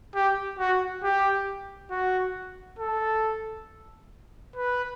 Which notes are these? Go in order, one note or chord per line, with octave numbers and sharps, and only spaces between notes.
G4
F#4
G4
F#4
A4
B4